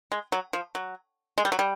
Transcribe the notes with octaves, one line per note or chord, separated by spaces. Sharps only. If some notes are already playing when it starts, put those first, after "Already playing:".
G#3
F#3
F3
F#3
G#3
G3
F#3
G3